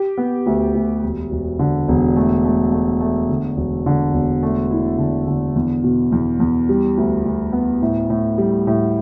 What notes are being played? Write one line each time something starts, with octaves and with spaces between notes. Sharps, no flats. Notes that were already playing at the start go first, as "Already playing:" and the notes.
Already playing: G4
B3
D2
D2
E1
E1
D3
E1
A3
A3
A3
A3
D3
E1
D3
E1
A3
E4
D3
D3
E2
B2
E2
E2
G3
D2
D2
B3
A2
A2
G3
A2